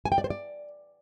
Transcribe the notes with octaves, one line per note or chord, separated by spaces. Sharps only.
G#5
G5
D5
C5
D5